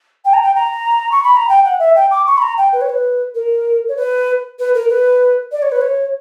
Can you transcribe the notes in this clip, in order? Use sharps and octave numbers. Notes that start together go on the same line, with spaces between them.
G5
A#5
G5
A#5
C#6
B5
A#5
G5
F#5
E5
G5
D6
C#6
B5
A#5
G5
B4
C#5
B4
A#4
C#5
B4
B4
A#4
B4
D5
C#5
B4
C#5